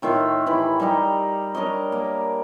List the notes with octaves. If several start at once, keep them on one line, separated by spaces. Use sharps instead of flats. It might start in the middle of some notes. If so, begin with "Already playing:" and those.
A2 D#3 F4 E5
E3 E4 G4 B4
G3 D#4 D#5 A#5
D4 A#4 C#5 D#5
A#3